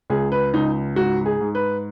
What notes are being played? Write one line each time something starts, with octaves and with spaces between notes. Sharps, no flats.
C#2 G#4
B4
C#2 D#4
G#2 F#4
G#4
G#2
B4